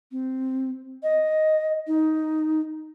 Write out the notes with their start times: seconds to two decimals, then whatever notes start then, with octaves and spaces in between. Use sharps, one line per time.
0.12 C4
1.03 D#5
1.87 D#4